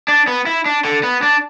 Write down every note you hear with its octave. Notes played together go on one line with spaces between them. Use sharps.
D4
B3
E4
D4
D3
B3
D4